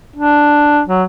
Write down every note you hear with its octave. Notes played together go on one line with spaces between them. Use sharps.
D4
F#3